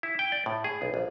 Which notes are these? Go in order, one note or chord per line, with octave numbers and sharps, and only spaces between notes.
E4
G5
D5
A2
G#4
B1
A#1